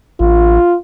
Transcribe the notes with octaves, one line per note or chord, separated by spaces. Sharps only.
A1 F4